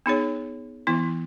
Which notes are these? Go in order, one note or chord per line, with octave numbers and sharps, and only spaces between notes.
B3 D#4 G#4 C#5
E3 B3 E4